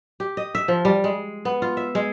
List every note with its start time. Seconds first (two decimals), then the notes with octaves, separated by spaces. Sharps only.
0.20 G4
0.37 D#5
0.55 E5
0.68 F3
0.85 G3
1.04 G#3
1.45 B3
1.62 F4
1.77 E5
1.95 G#3